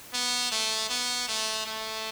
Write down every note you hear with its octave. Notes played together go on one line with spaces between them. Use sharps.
B3
A3
B3
A3
A3